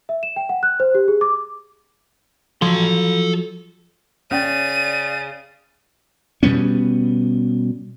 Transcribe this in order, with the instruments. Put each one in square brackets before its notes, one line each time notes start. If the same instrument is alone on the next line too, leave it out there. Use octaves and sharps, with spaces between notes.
[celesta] E5
E7
G5
F#5
F#6
C5
G4
G#4
D6
[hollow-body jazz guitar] F3 F#3 [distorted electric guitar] A4 C6
[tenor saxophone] C#3 [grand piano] C#4 G5 [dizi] D5 [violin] D#7
[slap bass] B2 G3 B3 C#4